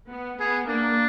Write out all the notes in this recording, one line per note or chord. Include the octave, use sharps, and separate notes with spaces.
B3
B3 G#4
A#3 D4